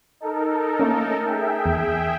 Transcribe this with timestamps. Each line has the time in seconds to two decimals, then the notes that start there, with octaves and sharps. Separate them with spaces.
0.20 D#4 A4 A#4
0.79 A3 A#3 C#4
1.24 G#4 E5 G5
1.66 E2